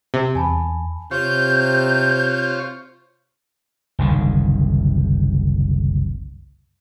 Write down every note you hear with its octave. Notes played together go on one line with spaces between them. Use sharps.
C3 G4
E2 G#5 A5 B5
C3 F4 C5 C#5 G6
F#1 C2 D3 D#3